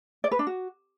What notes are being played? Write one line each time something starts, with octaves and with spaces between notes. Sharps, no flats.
D5
B4
D4
F#4